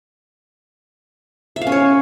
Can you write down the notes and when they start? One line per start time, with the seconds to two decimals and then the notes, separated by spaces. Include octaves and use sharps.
1.56 E5
1.61 F5
1.67 C#4
1.72 C#5